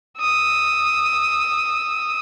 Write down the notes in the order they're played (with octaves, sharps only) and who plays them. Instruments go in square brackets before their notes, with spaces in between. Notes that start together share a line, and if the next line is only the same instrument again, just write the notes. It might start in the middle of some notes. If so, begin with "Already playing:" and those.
[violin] D#6 E6